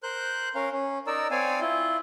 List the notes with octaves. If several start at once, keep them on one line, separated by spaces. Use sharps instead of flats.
A#4 C5 F#6 G6
C#4 A#4 F5
C#4
D#4 A#4 D5 E6
C4 C#5 D5 F5 G#5
E4 F4